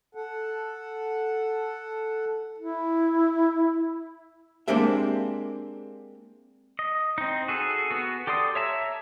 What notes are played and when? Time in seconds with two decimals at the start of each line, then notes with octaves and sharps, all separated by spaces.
0.15 A4 F#5
2.58 E4
4.68 G#3 A#3 C4 D4 G4 E5
6.79 D#5
7.18 C4 D#4
7.48 F#4 G#4 A4
7.91 B3 F#4
8.27 G4 A4 D5 C6 D#6
8.55 C#5 E5 A5 A#5